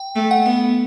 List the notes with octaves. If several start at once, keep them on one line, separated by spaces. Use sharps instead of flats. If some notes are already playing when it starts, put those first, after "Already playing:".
Already playing: G5
A3
F#5
B3